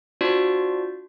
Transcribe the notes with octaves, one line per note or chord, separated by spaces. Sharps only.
D4 F4 F#4 C5 D5